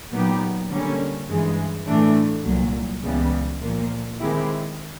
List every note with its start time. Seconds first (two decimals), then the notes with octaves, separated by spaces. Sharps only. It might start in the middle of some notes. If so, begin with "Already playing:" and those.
0.11 A#2 F#3 B3 D#4 G4
0.69 D3 G3 A#3 C#4
1.27 G2 E3 G#3
1.86 A2 E3 A3 D4
2.43 C2 A#2 F#3
3.02 C#2 C#3 E3 G3 B3
3.60 A#2 F3 A#3
4.18 D#3 G#3 C4 E4 G4